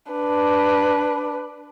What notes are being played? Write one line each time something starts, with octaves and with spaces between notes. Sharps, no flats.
D4 B4